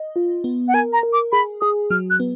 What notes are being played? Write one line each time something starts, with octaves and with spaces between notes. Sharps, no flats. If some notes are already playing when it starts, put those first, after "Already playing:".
Already playing: D#5
F4
B3
F#5
A#4 G#5
A#5
A#4
D6
G#4 B5
G#4 D#6
F#3 F6
F#6
B3